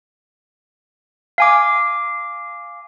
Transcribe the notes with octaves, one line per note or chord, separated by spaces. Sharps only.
F5 G#5 D6